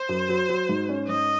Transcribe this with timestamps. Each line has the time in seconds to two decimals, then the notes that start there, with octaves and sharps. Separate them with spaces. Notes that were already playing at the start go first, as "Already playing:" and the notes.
Already playing: C5
0.09 F#2
0.29 F#3
0.49 F#3
0.69 G#2
0.89 C#4
1.08 G#2 D#5